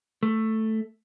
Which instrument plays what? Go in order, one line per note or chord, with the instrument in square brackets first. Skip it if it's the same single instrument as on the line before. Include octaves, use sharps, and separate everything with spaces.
[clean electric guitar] A3